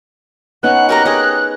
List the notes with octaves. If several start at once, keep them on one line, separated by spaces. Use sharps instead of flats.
B3 C#4 D#4 F#5 F#6
F#4 G4 A#4 A#5
G4 G#4 C#5 D#5 G#5